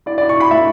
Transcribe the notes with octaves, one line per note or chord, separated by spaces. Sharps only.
E4 D5
D5
E4
C#6
E4 B5
A3 E5